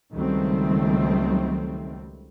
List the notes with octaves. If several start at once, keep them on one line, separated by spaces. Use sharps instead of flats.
C#2 D#3 F#3 G3 A3 C4